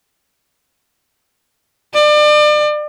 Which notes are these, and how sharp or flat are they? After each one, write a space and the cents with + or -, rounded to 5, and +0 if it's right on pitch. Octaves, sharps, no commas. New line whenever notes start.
D5 +35